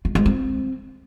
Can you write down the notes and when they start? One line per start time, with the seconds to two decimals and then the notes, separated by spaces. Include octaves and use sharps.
0.05 G#3
0.15 G#3
0.26 C4